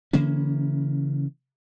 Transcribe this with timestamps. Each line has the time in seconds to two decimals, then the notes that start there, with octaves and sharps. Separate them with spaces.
0.13 C#3 E3 A#3 C#4